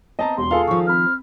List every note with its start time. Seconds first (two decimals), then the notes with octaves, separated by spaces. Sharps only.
0.19 B3 C4 D#5 A5 A#5
0.37 E1 C6
0.51 F4 G#4 A4 F5
0.67 D#3 F3 C#6
0.87 C4 B5 F6